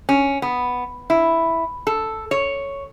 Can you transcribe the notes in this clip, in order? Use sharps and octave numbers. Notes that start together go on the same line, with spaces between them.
C#4
B3
E4
A4
C#5